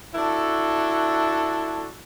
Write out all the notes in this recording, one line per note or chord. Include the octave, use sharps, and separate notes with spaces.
D4 E4 F#4 A4